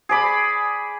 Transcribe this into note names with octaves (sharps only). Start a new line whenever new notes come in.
G#4 D5 B5